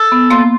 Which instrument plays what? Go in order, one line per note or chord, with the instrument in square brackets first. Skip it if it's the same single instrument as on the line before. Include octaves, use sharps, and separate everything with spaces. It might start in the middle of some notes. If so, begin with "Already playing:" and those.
Already playing: [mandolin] A4
[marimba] B3
[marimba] A#3 [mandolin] F4